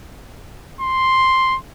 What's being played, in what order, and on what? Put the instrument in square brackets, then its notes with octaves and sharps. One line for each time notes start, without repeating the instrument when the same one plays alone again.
[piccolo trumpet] C6